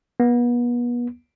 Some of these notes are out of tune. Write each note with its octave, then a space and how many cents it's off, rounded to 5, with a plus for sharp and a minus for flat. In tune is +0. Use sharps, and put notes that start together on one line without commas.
B3 -35